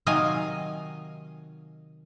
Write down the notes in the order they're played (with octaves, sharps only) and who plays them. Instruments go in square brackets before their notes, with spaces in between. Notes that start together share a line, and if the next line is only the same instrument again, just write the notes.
[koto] C3 D#3 F#3 D#5 F5 G#5